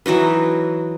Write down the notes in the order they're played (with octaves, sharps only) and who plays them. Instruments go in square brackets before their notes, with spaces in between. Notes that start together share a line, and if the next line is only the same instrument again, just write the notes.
[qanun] E3 F#3 D#4 B4